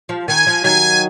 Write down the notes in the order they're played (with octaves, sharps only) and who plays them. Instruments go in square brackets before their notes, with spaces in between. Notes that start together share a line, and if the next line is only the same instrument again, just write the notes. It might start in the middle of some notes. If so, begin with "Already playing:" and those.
[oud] F3
[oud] D#3 [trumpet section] G#5
[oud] F3
[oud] D#3 F#3 [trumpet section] G#5